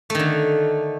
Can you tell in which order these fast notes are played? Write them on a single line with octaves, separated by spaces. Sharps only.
A3 D#3 D3